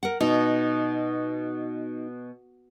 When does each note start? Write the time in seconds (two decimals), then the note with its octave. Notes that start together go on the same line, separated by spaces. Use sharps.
0.03 A#4 F#5
0.21 B2 D#4